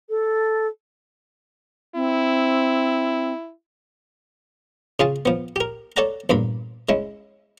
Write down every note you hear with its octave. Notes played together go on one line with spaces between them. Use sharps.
A4
C4 E4
C#3 F4 G#4 A5
F3 B3
G4 A#4
A4 C#5 D5 F#5 A#5
E2 G2 A#2 B5
G#3 C#4 E4